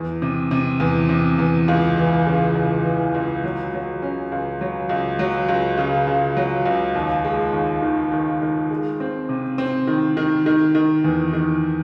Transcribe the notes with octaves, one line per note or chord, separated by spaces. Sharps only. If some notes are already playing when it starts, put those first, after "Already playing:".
Already playing: E2
C3
C3
E2
C3
E2
C#2
E3
C#3
C#2
E3
C#2
F#3
F#3
C#4
C#2
F#3
C#2
F#3
C#2
C#3
C#3
F#3
C#2
D#2
G#3
D#2
D#3
D#3
D#3
G#3
C4
C3
C4
D#3
D#3
D#3
D#3
E2
D#3